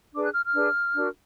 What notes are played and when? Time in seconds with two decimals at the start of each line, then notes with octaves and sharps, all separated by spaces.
0.14 D4 G#4 B4 D6
0.23 F#6
0.34 F6
0.44 F6
0.54 D4 G#4 B4
0.94 D4 F#4 A#4